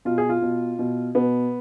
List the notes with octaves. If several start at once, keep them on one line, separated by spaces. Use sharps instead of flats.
B2 F4
G#4
F4
B2
B2
B2 B3